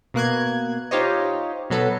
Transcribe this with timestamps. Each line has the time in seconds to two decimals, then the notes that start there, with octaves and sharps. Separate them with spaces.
0.14 B2 A#3 F#6 G#6
0.91 D#4 F4 G4 C5 C#5 D#5
1.70 B2 F#3 A4 B4